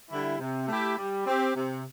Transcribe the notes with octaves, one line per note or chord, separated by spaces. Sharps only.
D3 G3 E4
C3
A3 E4 G4
G3
C4 G4
C3